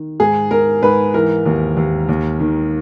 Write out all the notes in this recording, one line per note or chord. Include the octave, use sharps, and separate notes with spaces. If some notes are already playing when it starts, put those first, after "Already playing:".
Already playing: D#3
G#2 G#4
G#2 A#4
G#2 B4
E3 A#4
D#2
D#2
D#2
D#3